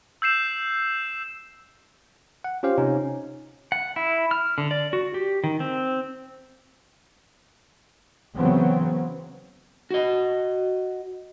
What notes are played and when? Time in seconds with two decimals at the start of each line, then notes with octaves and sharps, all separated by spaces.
0.22 E6 G6 C7 E7
2.44 F#5
2.63 C#4 F4 G4 C5 F5
2.78 C3 C#4 D#4
3.72 F#5
3.96 E4
4.31 F6
4.58 D3
4.71 D5
4.93 F#4
5.14 G4
5.44 D#3
5.60 C4
8.36 C#3 E3 F#3 B3 C4
9.91 F#4 D#5